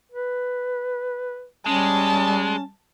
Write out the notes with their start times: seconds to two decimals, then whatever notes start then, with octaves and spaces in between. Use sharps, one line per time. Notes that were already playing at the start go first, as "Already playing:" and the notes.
0.12 B4
1.66 G3 G#3 C#4 A5